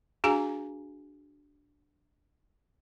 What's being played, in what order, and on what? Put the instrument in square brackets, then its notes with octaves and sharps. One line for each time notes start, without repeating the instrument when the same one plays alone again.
[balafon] D4 F#4 G#4 F5 G#5 A#5